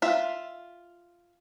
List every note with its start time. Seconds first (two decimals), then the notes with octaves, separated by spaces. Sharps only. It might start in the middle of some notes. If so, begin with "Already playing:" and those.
0.02 F4 E5